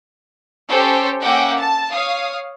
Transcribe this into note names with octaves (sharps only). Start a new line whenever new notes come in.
C#4 G4 A4 C5 G5
A#3 C#4 E5 F#5 G5 D6
A5
C#5 F5 D#6